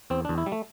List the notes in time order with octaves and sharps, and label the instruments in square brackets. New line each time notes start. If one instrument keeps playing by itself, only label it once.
[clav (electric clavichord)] E2 C4
E2 D4
E4
G3
A3